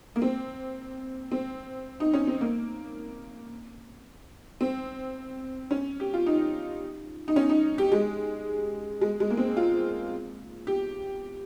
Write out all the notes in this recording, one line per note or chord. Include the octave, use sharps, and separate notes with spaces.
A#3
C4
C4
D#4
C#4
C4
A#3
C4
C#4
G4
F4
D#4
D#4
C#4
D#4
G4
G#3
G#3
G#3
A#3
C4
F4
G4